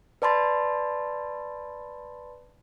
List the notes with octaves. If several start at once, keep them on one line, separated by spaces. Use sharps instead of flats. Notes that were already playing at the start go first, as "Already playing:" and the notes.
B4 D5 A5 B5 C6 A6